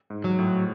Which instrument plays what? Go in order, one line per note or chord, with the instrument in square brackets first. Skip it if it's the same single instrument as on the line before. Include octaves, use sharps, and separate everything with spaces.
[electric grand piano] G#2
[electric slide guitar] F#3
[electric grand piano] A2